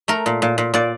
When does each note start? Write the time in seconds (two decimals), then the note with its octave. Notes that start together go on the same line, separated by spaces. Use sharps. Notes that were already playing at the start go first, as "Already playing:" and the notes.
0.08 A3 A#4
0.26 A#2
0.42 A#2
0.58 A#2
0.74 A#2 D5